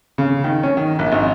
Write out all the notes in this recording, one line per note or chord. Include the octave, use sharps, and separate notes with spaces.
C#3
D#3
C#4
D#3
A#1
G#1